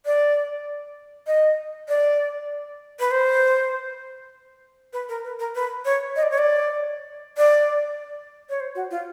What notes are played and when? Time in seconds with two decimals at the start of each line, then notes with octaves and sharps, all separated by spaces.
0.06 D5
1.27 D#5
1.89 D5
3.00 B4
3.11 C5
4.93 B4
5.09 A#4
5.24 B4
5.39 A#4
5.55 B4
5.85 C#5
6.16 D#5
6.23 D5
6.31 C#5
6.38 D5
7.37 D5
8.50 C#5
8.60 C5
8.75 F#4
8.91 F4